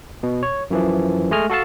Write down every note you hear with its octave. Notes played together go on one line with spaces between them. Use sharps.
B2
C#5
F#2 E3 F3
G#3 A3 D#5 G#5 F6
F#4 A4 F5 A5